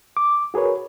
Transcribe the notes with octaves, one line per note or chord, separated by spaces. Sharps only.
D6
F#4 G#4 A#4 B4 C#5